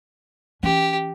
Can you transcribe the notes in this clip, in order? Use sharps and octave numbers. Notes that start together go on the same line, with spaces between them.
E3 C#4 G4